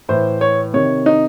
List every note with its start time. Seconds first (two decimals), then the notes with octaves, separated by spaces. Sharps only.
0.09 A2 E3 C5
0.41 C#5
0.73 C3 D#3 C#5
1.06 D#4